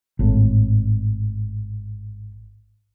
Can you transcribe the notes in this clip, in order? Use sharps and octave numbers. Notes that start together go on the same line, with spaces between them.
G#1 A2